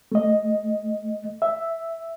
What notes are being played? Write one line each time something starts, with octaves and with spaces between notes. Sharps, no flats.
A3 D#5
E5